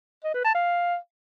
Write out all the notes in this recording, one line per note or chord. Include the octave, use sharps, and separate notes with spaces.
D#5
B4
A5
F5